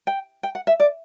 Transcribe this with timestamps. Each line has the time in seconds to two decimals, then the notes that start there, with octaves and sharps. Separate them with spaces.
0.07 G5
0.43 G5
0.55 F#5
0.67 E5
0.80 D5